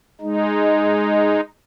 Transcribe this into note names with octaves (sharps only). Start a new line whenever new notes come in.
G#3 D#4